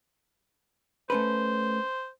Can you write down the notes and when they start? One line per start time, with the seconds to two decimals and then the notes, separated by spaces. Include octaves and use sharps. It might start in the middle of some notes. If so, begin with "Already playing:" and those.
1.10 A3 C#4 B4 C5